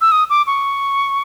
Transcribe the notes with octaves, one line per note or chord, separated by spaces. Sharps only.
E6
D#6
D6
C#6